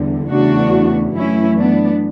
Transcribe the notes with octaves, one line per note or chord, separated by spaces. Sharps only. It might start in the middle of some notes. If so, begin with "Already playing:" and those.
Already playing: E2 D3 G3
E2 C#3 E3 A3 D4 F#4
F#2 E3 A3 C#4 E4
B3 D4